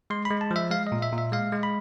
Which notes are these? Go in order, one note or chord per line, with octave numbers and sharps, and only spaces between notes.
G#3 C6
B5
G#3
A5
F3
E5
G#3 F5
D#5
A#2
E5
A#2
E5
G#3 F5
G#3
B5